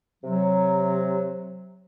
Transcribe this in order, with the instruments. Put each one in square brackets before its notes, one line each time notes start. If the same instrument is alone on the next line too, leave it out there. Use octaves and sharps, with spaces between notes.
[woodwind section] C3 F#3